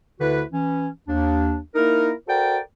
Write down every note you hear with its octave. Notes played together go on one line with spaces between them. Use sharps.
D2 D3 E4 F#4 B4
E3 C#4
D#2 D4
A#3 D#4 E4 A#4
F#4 A4 A#4 C5 D5 G5